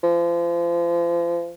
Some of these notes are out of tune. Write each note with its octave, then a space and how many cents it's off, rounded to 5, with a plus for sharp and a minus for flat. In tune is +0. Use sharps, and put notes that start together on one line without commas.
F3 -35